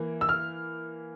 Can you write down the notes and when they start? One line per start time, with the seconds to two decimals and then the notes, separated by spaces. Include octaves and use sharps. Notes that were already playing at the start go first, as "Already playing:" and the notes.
Already playing: E3 A#3
0.21 E6
0.29 F6